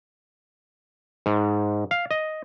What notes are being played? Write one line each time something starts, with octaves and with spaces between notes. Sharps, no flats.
G#2
F5
D#5